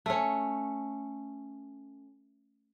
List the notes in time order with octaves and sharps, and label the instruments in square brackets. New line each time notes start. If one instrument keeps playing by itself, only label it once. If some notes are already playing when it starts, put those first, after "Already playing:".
[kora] A3 C#4